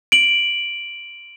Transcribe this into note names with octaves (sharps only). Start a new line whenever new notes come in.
D7 F#7